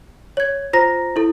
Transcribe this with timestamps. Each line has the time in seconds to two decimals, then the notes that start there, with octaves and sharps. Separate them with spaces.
0.37 C#5 G#6
0.73 F4 C5 A#5 A#6
1.16 E4 A4